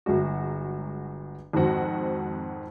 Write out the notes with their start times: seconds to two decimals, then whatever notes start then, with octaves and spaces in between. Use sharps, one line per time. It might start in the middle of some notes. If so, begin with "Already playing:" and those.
0.06 G1 F#3 G#3 F#4
1.53 F2 G#2 D#3 C4 F#4 F#5